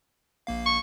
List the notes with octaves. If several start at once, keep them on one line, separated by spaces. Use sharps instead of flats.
A#1 A#3 F5
C#6